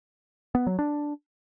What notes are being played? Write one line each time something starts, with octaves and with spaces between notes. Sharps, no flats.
B3
F#3
D4